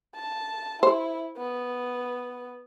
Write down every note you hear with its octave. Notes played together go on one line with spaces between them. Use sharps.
A5
E4 C5
B3